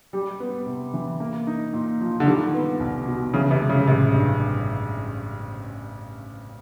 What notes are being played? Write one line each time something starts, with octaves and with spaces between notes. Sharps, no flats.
G3
B3
C3
E3
A#3
D#4
A#2
F3
D3
D#3 G3
B3
C2
B2
C#3 E3
C3
G#3
C#3
A1 C3
G2